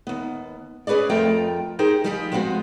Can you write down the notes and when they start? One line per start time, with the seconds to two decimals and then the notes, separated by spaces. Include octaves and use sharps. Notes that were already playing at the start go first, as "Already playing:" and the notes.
0.07 D#2 B3
0.87 C#4 G#4 B4 C#5 D5
1.10 F2 A3 F4 A#4 G5 A#5
1.79 D#4 G4 G#4 A#4 C5
2.04 F3 G3 D#4 G4 G#4 G5
2.32 F3 G#3 B3 C4 F#4